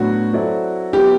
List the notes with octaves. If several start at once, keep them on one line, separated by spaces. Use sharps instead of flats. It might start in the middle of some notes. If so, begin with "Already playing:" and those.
Already playing: A2 F#3 B3 D4 F#4
F#3 C4 E4 A4 D5
F#3 B3 E4 G4